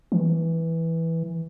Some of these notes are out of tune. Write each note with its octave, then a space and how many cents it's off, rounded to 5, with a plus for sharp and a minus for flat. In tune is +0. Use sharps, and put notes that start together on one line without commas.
E3 -5